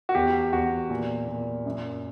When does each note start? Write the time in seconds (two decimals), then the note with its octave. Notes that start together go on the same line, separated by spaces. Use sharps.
0.09 F#4
0.15 E2 G4
0.53 E2 F#4
0.90 A#2
1.28 A#2
1.66 F#2